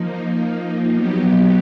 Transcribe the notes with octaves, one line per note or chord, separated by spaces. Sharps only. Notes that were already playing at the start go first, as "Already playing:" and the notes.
Already playing: F3 A#3 D#4
F#3 B3 D#4 G4